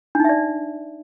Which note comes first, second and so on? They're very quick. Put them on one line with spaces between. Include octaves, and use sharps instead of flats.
D4 D#4 E5 D5